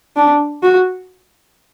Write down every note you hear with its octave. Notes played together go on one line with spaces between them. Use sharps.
D4
F#4